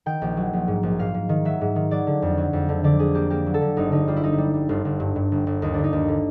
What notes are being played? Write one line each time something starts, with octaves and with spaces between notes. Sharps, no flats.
D#3 G5
A#1
F#3
A#1
G#2
A#1
G#2 F5
G#2
D#3
F#3 E5
G#2
D#3
F#3 D5
D3
F2
F#3
F2
D3
D3 D5
D3 G#4
A#3 G4
A#3 G4
F#3
A4
D3
G1 D#4
D3 D#4
G3 F4
E4
G3 D#4
E4
G3
G3
G1 F4
G1
G2
G2
G1
G1
D#2 D#4
D3 D4
D#4
D#2
D3